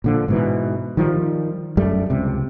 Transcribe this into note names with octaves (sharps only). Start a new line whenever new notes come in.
A#2 D3 F3
G#2 B2 E3
D#3 F3 G3
F#2 G3 A3
C#2 C3